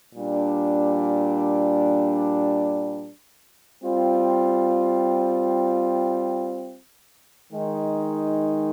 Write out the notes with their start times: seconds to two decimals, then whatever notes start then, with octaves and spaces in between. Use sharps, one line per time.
0.15 A#2 G3 D4
3.82 G3 C4 F4
7.50 D#3 G#3 D#4